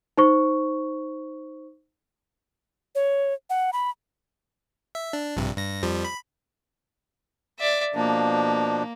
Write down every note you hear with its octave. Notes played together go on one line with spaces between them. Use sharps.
D#4 C5 C#6
C#5
F#5
B5
E5
D4
A#1 G2 C3
G2 A#6
F2 F3 G3
B5
D5 E5
B2 F3 A#3 D4